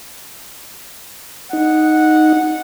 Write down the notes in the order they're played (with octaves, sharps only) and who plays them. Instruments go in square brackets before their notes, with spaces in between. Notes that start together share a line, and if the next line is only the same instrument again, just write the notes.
[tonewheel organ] D#4 [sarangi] F#5